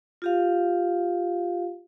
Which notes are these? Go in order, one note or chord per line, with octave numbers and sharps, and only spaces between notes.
F4 G4 F5